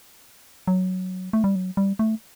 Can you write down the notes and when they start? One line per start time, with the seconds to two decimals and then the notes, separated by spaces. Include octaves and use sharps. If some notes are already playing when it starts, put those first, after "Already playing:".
0.68 F#3
1.33 A3
1.44 G3
1.55 F#3
1.77 G3
1.99 A3